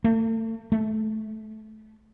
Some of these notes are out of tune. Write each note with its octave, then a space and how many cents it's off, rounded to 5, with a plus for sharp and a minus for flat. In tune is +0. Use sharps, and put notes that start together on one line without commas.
A3 +35
A3 -20